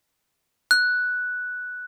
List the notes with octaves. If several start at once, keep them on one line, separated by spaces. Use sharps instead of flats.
F#6